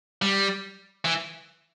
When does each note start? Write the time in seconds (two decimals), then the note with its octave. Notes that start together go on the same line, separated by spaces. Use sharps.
0.22 G3
1.05 E3